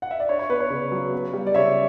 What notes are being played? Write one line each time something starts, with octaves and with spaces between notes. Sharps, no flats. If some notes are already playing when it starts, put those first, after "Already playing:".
F#5
E5
D5
D4 C#5
C#5
B3 B4
C#5
C#3
F#3
B3
G3
D5
C#3 C#5 E5